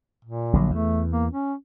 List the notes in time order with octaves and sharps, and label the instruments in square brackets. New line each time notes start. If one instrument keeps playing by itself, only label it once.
[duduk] A#2
[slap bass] A#1 D3 F#3
[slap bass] E2 [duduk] A3
[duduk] A#3
C#4